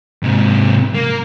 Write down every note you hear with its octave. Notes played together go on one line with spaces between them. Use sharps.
G#2 C3
A#3